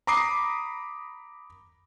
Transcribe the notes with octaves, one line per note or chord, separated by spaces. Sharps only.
A#5 B5 D6 D#6 C7